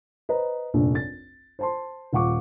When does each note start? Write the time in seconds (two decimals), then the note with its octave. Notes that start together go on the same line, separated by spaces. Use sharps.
0.29 B4 C5 D#5 A#5
0.74 F1 A#1 G2
0.95 A6
1.59 C5 A5 C6
2.13 D#1 F4 F#5 C#6 D6